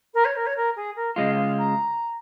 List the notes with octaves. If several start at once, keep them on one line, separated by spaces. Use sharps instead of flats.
A#4
C#5
A#4
C#5
A#4
G#4
A#4
C#3 G#3 F4 D#5
F5
A#5